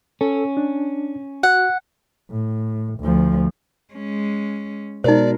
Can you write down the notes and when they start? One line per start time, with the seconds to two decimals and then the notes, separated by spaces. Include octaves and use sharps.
0.21 C#4 A4
0.57 D4
1.43 F#4 F#5
2.30 A2
3.00 D2 F3
3.93 G#3 C#4
5.04 B2 G#3 D#4 A#4 C5 D5